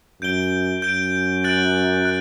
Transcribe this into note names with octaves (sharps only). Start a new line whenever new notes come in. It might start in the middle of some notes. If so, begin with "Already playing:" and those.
F#2 G6 D7 G7
F#2 G6 D7 G7
F#6 A6 D7 F#7
F#6